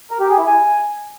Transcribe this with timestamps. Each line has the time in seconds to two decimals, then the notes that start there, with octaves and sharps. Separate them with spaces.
0.11 A#4
0.20 G4
0.29 G#4
0.38 E4
0.47 G#5